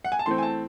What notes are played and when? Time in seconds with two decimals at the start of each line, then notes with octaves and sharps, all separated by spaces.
0.05 F#5
0.12 G#5
0.19 A5
0.26 E3 A3 C4 C6
0.38 G#5
0.43 A5